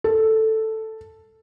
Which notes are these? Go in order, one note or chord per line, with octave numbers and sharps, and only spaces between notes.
A4